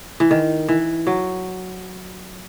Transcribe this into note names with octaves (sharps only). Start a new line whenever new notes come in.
E3
D#3
E3
F#3